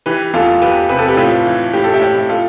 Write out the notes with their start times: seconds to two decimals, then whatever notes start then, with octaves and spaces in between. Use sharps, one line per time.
0.06 E3 G4 B4
0.34 E2 F4 A4
0.62 E2 G4 B4
0.89 C3 B4
0.99 A4
1.08 G4 B4
1.17 A2 F4 A4
1.46 E3
1.73 A2 G4
1.84 A4
1.94 E4 G4
2.01 A2
2.29 F4 A4